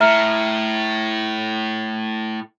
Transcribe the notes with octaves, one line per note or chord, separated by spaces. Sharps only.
A2 E5 A#5 F6